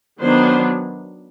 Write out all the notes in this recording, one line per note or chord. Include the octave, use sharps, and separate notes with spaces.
D#3 F#3 B3 D4 C5